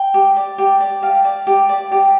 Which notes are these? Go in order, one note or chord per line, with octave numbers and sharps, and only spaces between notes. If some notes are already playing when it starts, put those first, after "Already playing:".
Already playing: G5
G4
D5
G4
D5
G4 F5
D5
G4
D5
G4